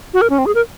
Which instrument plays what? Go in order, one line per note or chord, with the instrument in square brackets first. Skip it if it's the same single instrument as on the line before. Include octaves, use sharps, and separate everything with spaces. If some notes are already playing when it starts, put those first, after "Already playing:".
[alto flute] F#4
A#4
C#4
C4
G#4
A#4